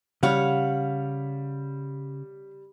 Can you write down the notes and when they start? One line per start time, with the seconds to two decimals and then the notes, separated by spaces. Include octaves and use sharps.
0.23 C#3 G3 C#5 F5 F#5